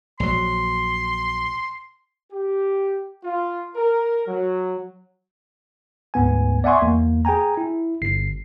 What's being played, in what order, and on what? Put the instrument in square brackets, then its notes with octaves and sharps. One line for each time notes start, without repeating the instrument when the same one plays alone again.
[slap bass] A#1 F#3 [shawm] C6
[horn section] G4
F4
A#4
F#3
[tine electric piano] D2 G#2 B3 G#5
D5 E5 F#5 G#5 C6 C#6
E2 A#3
G#4 G5 G#5 A#5
E4
G1 C7